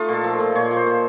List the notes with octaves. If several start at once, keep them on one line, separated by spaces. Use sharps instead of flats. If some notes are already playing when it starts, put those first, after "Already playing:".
Already playing: A3 D#4 F4
A#2 A4
F3
A#2
A#2 C#5
A#2
C5
A#2